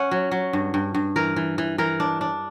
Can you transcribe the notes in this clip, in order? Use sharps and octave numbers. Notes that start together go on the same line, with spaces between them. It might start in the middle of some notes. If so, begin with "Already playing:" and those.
Already playing: C#4 F#5
F#3
F#3
G2
G2
G2
E3 A#4
E3
E3
E3 A#4
D4
D4